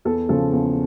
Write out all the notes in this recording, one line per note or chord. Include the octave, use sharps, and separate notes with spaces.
E2 A4
C#3 F3 A4
E2